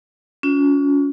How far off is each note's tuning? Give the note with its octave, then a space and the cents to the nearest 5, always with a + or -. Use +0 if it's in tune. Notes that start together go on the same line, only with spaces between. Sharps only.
C#4 +30 F4 +40